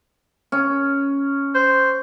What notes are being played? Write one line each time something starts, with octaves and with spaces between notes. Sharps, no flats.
C#4
C5